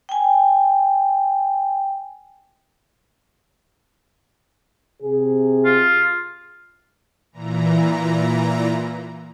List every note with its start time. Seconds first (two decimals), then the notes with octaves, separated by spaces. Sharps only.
0.09 G5 G#5
5.03 C3 G#4
5.65 F4
7.32 A#2 E3 A#5